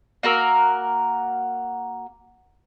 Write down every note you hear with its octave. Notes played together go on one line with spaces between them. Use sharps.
A#3 F#4 A#4 E6